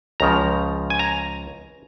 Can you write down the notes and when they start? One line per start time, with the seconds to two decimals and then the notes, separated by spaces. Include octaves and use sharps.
0.20 C#2 C#3 F3 A#5
0.90 G#5
0.99 A#5